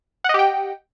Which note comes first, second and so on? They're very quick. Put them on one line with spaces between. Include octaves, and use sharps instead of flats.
F#5 D#5 G4 G5